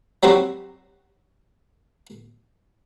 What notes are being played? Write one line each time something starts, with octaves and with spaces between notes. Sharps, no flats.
F#3 G3 C4 F#4 G4